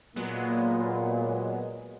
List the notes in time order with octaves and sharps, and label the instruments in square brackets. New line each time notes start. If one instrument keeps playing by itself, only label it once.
[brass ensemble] A#2 [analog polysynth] F#3 G#3 B3